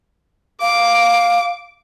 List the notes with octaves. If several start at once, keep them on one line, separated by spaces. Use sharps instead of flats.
F5 D6